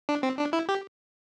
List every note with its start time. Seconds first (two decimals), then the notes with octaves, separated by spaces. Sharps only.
0.09 D4
0.23 C4
0.39 D4
0.53 E4
0.69 G4